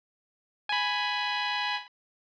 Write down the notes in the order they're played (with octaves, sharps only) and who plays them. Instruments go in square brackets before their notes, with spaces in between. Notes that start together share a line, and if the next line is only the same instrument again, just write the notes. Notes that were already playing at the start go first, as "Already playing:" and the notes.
[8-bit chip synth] G#5 B5